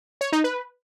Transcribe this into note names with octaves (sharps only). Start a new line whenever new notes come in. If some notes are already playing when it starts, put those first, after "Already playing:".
C#5
D#4
B4